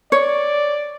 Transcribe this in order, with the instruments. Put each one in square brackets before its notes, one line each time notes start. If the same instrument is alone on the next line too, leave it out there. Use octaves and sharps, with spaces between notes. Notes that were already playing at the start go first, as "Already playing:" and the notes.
[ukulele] C#5 [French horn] D5